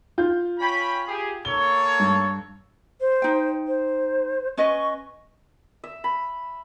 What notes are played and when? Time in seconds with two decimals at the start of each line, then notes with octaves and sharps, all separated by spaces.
0.18 F4 G6
0.59 C#4 G5 B5
1.06 G4 G#4
1.45 A#3 A4 C#5 G7
2.00 G2
3.01 C5
3.22 D#4 G5
3.67 C5
4.57 C#4 B4 D#5 C#6
5.84 E5
6.04 B5